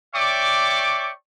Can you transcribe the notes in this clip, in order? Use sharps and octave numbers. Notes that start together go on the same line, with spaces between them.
C#5 D5 E5 G5 C#6 D6